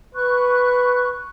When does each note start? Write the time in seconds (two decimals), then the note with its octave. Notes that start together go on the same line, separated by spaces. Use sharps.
0.15 B4 C#6 F#6